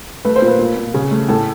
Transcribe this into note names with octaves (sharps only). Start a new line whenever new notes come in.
A3 B4
C5
A#2
B4
A#2
A#2
C#3
A3
A2 A4